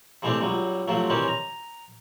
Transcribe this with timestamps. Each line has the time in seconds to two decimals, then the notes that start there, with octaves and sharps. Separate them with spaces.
0.22 C3 E3 G#3 A3 C4 D4
0.41 C#2 F#3 G3
0.88 C3 F3 F#3 A3
1.10 D#3 E3 G3 C4 C#4
1.28 A#5